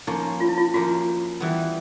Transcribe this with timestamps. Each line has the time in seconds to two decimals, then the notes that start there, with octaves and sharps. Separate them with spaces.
0.07 F3 A#3 C#4 D#4
0.40 F4
0.49 E4
0.58 F4
0.74 F3 A#3 C#4 F#4
1.40 E3 G3 B3